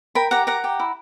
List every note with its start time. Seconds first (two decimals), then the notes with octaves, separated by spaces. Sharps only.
0.15 A#4 G5 B5
0.31 G4 F#5 A#5
0.47 A#4 F#5 A#5
0.64 G4
0.79 E4